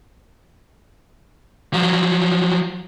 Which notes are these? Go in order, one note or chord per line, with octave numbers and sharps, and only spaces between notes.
F3 F#3